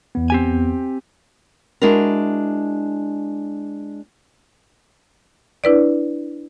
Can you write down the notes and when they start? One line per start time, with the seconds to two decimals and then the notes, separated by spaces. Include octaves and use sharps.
0.15 E2 B3
0.30 C4 G4 G#5
1.82 G#3 D4 E4 F#4 A#4
5.64 D4 E4 B4 D5